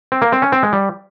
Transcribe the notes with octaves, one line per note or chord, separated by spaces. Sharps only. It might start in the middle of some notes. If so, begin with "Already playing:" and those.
C4
A#3
C4
C#4
C4
G#3
G3